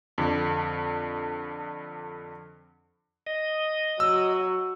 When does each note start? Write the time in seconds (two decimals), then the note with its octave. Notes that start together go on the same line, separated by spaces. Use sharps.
0.18 F2 D3
3.27 D#5
4.00 F#3 E6